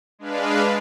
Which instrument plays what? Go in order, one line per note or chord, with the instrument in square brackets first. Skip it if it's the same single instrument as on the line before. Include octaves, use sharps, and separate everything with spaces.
[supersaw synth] G#3 D4 B4 F5